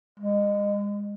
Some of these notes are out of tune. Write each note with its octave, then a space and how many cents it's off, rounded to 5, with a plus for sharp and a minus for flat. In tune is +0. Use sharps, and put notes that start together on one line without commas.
G#3 -30